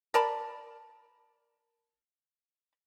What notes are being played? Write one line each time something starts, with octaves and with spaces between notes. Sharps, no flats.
A#4 D5 A5 B5